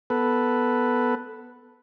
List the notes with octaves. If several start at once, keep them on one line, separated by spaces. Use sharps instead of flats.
B3 A4 B4